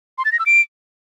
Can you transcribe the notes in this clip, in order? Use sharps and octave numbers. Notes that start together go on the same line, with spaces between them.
C6
A6
A#6
E6
D7